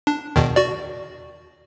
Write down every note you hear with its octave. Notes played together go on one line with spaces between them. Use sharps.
D4
E2 B2 D#3
F#4 D5